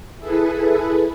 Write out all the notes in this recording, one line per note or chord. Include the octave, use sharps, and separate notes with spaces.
E4 G#4 A4 B4